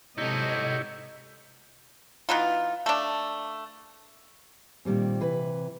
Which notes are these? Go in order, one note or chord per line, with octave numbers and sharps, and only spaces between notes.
G#2 C3 D#4 E4 G4 A4 C#5 D#5
E3 B3 D#4 F4
A3 D4
A#2 D#3 G3 C4
C3 E3 B4